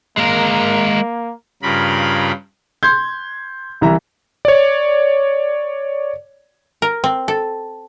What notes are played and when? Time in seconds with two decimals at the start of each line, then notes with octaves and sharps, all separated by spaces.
0.17 G#3 A#3 A#4
1.62 G2 C#3 F4 A#4 B5
2.83 C6 G6 G#6
3.81 C2 E3 E5 A#5
4.45 C#5 D5
6.82 A#4
7.04 C4
7.28 A4